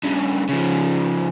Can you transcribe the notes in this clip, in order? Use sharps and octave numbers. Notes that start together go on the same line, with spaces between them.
G2 C#3
C#3 F3